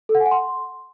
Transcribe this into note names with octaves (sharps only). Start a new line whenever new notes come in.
A4
F#5
G#5
F#5
C6